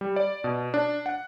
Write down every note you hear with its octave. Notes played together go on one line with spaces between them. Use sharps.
G3
D5
B2
D4
F#5